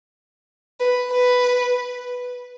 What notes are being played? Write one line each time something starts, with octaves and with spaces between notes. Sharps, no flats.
B4
B4